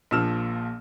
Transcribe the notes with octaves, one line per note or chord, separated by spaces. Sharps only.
A#1 A#2 F3 E6 F6 E7